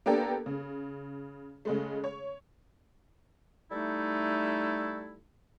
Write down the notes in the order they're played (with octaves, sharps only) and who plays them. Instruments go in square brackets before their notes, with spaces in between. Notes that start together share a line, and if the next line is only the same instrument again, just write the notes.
[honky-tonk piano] A#3 B3 D4 G4 A4 A#4
C#3
C#3 G#3 A3
C#5
[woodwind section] G3 A3 D#4 E4 A4